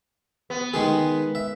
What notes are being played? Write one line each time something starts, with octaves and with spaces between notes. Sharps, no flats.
B3
D#3 G#3 G#4
E5